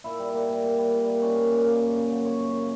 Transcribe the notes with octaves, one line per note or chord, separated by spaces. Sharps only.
A#2 E4
G3
A#3
A#2
A#2
G3
A#2
A#3
C#4
A#2
A#2
A#3
F#2
C#3
F#3
C#4 C#5
F#2
C#3